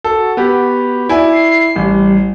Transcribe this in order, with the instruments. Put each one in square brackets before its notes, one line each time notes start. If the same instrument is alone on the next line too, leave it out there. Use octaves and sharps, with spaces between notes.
[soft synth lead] F#4 [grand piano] A4
[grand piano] B3 G4
E4 D5 G#5
[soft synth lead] C7
[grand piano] A1 [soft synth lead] G3